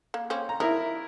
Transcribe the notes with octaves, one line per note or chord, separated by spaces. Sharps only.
A#3
A#3 C4 C#4
A#5
D#4 E4 A#4 E5